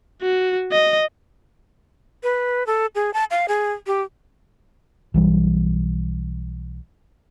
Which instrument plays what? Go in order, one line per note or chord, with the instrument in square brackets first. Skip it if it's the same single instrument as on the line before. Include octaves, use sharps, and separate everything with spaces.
[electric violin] F#4
D#5
[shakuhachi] B4
A4
G#4
A5
F5
G#4
G4
[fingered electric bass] B1 E3 G3